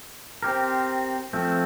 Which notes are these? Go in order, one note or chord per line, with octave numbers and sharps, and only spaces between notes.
C4 G4 A#4
F3 A3 C4